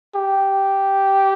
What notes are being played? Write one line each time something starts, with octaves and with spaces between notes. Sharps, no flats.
G4